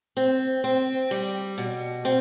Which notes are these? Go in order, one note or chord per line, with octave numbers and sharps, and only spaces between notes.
C4
C4
G3
B2
C4